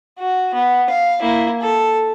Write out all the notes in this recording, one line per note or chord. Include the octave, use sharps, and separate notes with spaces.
F#4
B3
F5
A#3 E4
A4